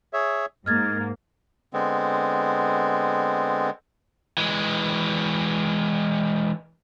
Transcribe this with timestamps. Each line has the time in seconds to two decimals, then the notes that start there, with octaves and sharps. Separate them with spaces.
0.13 G#4 C#5 E5
0.66 G#2 A#3 D#5 F6 G#6 A6
1.73 D3 G#3 B3 C4
4.38 E3 G#3